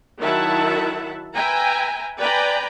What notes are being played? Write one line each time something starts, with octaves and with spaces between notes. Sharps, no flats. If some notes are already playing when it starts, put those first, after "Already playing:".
D#3 F#3 E4 E5 F#5 A5
B4 E5 G5 G#5 A#5
B4 D5 G5 G#5 A#5 B5